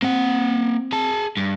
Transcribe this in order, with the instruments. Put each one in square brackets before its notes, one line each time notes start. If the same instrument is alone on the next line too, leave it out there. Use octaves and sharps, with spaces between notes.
[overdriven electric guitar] A#3 F#5 [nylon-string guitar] C4
[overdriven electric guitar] G#4 A5
G2